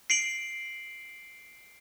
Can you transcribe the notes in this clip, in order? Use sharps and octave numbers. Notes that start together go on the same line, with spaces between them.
C7 D7 F#7